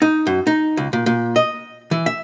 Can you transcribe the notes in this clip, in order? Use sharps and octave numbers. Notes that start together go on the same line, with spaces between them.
D#4
F#2
D#4
C#2
A#2
A#2
D#5
E3
E5